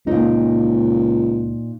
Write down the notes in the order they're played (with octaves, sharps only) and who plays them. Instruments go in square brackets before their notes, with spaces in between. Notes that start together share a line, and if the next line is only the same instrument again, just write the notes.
[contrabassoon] C#2 [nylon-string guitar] A#2 D#4